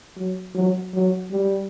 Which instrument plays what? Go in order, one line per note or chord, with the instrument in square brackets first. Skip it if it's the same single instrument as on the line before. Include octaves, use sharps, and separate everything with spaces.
[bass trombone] F#3
F#3
F#3
G3